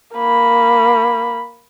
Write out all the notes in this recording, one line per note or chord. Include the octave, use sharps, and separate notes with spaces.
A#3 B5